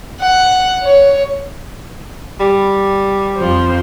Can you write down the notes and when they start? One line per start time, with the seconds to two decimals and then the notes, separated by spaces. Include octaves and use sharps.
0.21 F#5
0.84 C#5
2.40 G3
3.37 F2 F3 C5